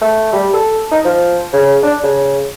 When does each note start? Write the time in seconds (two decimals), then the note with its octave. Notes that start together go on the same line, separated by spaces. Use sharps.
0.01 A3
0.33 G3
0.53 A4
0.91 D#4
1.05 F3
1.54 C#3
1.83 D4
2.04 C#3